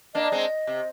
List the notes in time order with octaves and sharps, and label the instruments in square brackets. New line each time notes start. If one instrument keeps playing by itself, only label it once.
[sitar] A#3 D4 [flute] D#5
[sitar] G#3 C4
C3